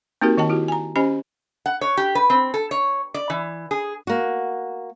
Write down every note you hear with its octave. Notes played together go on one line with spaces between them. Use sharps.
A#3 C4 D#4 F#4 G4 A#4
D#3 D#5 G5 A5
E4 F#4 G4
G#5 A#5
C#4 G4 C5 D#5 G#5 B5
F#5
C#5
G4
B4
C4
A4
C#5
D5
E3
G#4
A#3 F#4